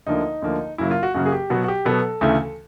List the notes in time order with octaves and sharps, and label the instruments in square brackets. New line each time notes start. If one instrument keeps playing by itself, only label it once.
[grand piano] D2 D3 F3 A#3 D#4
D2 D3 F3 A#3
F#2 C#3 F#3 A#3 E4
F4
F#4
F#2 C#3 F#3 A#3 F#4
G#4
G4
B2 F#3 B3 F#4
F#4
G4
B2 F#3 B3 A4
D2 C#3 E3 A3